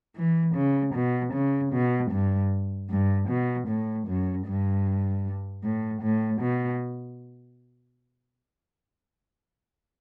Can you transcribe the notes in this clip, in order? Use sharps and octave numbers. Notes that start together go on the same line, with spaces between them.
E3
C#3
B2
C#3
B2
G2
G2
B2
A2
F#2
G2
A2
A2
B2